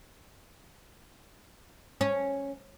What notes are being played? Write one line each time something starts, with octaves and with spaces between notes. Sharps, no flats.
C#4